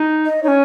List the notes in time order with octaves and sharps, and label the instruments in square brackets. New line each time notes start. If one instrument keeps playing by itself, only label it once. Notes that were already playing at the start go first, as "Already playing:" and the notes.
Already playing: [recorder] D#4
[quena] D#5
[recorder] C#4 D#4 [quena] C#5